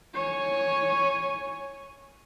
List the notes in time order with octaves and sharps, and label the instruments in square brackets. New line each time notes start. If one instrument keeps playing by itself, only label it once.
[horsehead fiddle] C#5 G#5